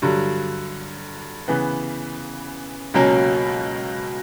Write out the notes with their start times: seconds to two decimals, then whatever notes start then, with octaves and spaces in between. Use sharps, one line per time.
0.02 G2 D3 F#3
1.48 C#3 E3 B3
2.94 C#2 B2 F#3 A#3 C#4